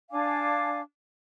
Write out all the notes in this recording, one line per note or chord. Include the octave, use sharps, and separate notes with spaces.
D4 F5 G#5 D6